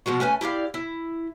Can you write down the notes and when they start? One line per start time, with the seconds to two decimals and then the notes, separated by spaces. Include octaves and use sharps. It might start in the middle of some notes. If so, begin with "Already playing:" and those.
0.06 B2 F3 G#3 F#4
0.20 A3 C#4 B4 G#5
0.41 E4 G4 D5 F5
0.74 E4